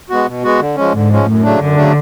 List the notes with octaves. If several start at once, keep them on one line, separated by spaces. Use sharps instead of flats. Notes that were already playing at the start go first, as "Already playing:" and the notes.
G#3 B3 F#4
B2
G#3 B3 F#4
D3
F3 G#3 C#4
G#2 D3
F3 G#3 C#4
F#2 A2
C#3 F#3 A3 D4
F#2 D3
C#3 F#3 A3 D4